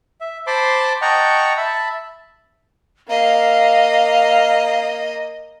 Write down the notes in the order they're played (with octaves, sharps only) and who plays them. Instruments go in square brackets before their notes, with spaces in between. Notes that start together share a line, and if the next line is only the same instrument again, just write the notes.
[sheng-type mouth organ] E5
C5 A5 B5 C6 D6
D#5 F#5 G5 A5 A#5 C#6
E5 A5 B5
[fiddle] A#3 D#5 [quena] F5